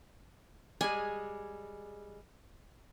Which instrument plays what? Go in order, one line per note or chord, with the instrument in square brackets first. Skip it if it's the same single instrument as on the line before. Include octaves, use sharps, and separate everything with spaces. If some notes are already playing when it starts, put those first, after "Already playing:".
[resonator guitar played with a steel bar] G3 G#3 G#4 [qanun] G#5